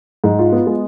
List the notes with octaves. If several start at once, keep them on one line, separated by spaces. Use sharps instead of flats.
G#2
F4
B3
G#3